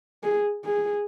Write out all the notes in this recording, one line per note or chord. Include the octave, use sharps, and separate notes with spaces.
G#4
G#4